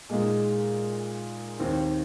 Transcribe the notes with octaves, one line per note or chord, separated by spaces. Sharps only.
A#2 G#3 D#4 G#4
D#2 D#3 C4